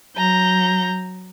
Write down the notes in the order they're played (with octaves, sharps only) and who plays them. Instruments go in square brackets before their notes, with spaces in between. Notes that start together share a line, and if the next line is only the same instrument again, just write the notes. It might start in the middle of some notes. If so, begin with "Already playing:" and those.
[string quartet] F#3 A#5 G6